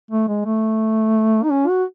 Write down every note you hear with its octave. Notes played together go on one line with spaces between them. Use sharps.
A3
G#3
A3
D#4
C#4
F#4